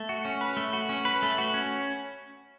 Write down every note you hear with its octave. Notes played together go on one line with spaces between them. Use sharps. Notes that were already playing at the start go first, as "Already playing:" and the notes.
Already playing: A3
F#4
C#4
B4
A3
F#4
C#4
B4
A3
F#4
C#4